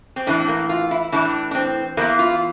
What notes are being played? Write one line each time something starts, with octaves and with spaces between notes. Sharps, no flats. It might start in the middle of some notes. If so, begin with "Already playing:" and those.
C4
A2 E3 D4
A#3
F4
E4
A2 E3 D4
D4
C4
E2 E3 A#3
F4